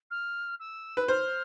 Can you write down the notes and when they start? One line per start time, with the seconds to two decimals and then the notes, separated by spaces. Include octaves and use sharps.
0.11 F6
0.60 E6
0.97 B4
1.08 C5 F6